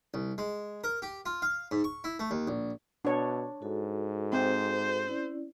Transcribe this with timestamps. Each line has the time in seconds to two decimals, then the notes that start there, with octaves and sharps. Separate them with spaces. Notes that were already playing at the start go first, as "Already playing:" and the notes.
0.14 C2
0.38 G#3
0.84 A#4
1.02 G4
1.26 F4
1.42 F5
1.71 G#2
1.84 C#6
2.04 E4
2.19 A3
2.31 D#2
2.48 A#1
3.05 B2 D4 C#5
3.62 G#2 F#4 A4
4.33 C4 C5
5.06 C#4 E4 D5